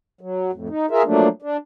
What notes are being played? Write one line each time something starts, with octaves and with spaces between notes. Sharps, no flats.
F#3
F2 A2
D#4
F4 G#4 A#4 E5
F3 F#3 A3 A#3 D4
D4